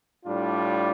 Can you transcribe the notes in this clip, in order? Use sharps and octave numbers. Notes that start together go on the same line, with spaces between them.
A2 G3 D4 F4